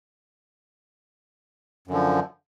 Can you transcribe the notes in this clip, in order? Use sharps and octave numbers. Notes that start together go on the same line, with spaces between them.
F#2 D3 F3